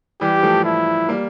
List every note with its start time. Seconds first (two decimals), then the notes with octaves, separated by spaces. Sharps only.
0.21 E3 G3 G4
0.43 F3 A3
0.65 E4
1.09 G3 A#3